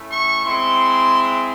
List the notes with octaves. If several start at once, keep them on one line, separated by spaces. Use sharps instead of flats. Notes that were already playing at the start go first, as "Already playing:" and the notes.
Already playing: A3 C#4 E4
C#6
G#3 C4 E4 C6